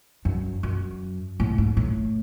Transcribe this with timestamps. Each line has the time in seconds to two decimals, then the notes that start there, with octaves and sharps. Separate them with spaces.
0.25 F#2
0.63 F#2
1.40 A2
1.58 G#2
1.77 A2